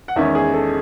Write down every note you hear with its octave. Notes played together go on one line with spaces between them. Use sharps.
F#5
E2 D#3 G#3 C#4 E5
G#4
A4